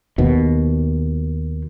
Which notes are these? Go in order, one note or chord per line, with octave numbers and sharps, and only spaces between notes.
D#2 B2